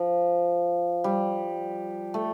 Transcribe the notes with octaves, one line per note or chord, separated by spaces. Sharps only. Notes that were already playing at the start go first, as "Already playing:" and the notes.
Already playing: F3
G3
A3